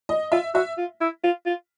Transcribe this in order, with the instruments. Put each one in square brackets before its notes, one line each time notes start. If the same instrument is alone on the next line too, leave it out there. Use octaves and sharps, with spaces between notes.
[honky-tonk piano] D#5
[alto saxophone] F4 [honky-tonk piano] E5
[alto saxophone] F#4 [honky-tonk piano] E5
[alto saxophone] F4
E4
F4
F4